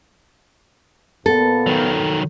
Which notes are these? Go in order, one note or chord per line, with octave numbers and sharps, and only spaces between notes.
A#2 B3 A4
D#3 F#3